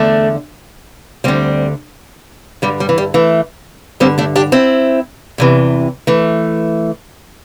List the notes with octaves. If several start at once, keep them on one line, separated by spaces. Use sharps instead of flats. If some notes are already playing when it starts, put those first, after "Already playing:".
Already playing: E2 D3 A3 D4
D2 D3 G3 C4
G2 D3 G3
G3
E3
G3
E3 A3
G2 D3 G3 C4
A3 D4
D4 G4
C4 E4
E2 C3 E3
E3 A3